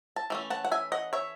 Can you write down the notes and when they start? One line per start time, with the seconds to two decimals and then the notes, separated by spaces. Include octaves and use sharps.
0.16 A5
0.30 E3 A3 C#4
0.50 F#5 A5
0.65 F#5
0.72 E5 G#5
0.92 D#5 F#5
1.13 C#5 E5